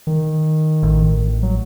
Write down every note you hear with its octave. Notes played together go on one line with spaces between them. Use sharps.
D#3
A1
F#3